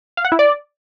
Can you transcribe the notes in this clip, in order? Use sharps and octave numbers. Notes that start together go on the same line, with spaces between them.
F5
F#5
E4
D5